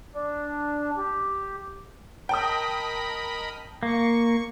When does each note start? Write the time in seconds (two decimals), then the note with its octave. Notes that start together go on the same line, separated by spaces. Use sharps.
0.14 D4
0.97 G4
2.29 A#4 D#5 G5 A5 B5 D#6
3.83 A#3 C#6